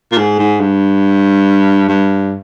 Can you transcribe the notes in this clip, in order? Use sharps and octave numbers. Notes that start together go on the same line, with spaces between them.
A#2
G#2
G#2
G2
G2